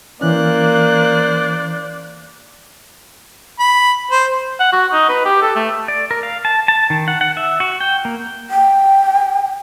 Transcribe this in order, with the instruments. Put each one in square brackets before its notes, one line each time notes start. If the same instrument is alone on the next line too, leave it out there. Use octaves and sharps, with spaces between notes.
[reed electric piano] E3 C#4 [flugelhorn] A#3 [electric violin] C5 F#6 [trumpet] D5
[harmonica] B5
C5
[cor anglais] F#5
F#4
D#4
B4
G4
A4
A3
[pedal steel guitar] D5
A#4
F5
A5
A5
D#3
F#5
F#5
E5
F#4
G5
A#3
[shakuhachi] G5